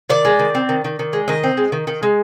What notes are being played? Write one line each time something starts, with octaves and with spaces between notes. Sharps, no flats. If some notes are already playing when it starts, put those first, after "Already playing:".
D#3 D5
G#3
D#3
C4
D#3
D#3
D#3
G#3
D#3 D#5
C4
G#3
D#3
D#3
G#3